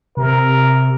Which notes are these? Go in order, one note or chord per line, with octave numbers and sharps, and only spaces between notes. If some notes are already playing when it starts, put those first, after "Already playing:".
C3 A#4